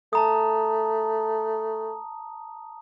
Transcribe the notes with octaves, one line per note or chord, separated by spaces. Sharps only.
A3 A5 A#5 D#6